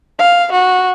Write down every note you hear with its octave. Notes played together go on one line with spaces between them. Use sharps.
F5
F#4